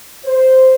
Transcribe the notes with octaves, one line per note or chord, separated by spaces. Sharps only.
C5